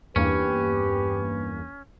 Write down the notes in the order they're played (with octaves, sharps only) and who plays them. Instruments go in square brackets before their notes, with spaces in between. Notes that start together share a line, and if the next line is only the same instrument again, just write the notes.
[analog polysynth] E2 G2 A#3 [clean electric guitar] C#4 [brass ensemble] G4 [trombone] B4